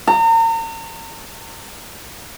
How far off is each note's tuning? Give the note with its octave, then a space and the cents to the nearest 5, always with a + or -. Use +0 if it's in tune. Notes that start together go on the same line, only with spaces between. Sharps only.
A#5 -40